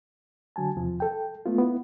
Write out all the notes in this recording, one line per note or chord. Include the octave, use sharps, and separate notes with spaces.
D3 F#3 G#5 A5
E2 C3 F3
A4 G5
A3 B3 F4
B3 E4